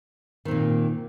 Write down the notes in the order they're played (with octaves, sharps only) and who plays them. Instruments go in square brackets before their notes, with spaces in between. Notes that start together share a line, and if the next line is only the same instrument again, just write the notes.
[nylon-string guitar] D#3
C4
A#2